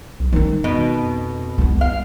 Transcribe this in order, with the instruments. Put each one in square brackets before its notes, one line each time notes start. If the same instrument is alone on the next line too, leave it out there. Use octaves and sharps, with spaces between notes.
[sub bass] B1
[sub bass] D#3 [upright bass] C#4 D#4
[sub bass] F2 [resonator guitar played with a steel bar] B2
[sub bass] C2 [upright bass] B3 E4
[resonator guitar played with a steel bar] F5